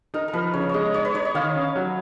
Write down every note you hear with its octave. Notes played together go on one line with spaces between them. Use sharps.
D#4 A#4
A#4
F3 B4
C#3 C#5
G#3 C#5 D#5
D#4 C#5
B4
D#4 C#5
D#5
D#3 F5
C#4
F#3